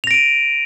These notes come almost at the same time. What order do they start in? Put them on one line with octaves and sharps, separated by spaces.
F7 A#6 D7 D#7